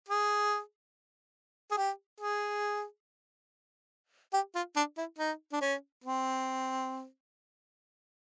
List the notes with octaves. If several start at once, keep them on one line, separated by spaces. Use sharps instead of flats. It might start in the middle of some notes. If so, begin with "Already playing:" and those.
G#4
G#4
G4
G#4
G4
F4
D4
E4
D#4
D4
C#4
C4